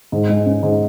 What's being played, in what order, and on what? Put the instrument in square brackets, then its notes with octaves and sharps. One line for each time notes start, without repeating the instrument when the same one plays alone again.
[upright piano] G#2
G#3
C#4
G#2